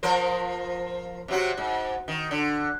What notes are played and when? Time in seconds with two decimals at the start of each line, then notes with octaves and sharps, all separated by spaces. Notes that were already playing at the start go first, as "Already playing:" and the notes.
0.03 F3 A#4 C5
1.28 C3 F#3 F#4
1.57 G#2
2.08 D#3
2.31 D3